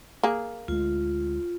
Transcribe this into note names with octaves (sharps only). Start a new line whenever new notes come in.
A#3 G#4
D2 G#3 F4